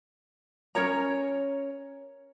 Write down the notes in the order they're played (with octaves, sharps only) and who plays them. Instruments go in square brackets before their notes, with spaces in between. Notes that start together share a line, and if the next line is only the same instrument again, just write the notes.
[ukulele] C#4 A#4 C#5 A#5